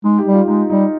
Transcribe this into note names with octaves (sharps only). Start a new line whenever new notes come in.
G#3 D#4
G4
G3
F4
G#3 D#4
G3 D#4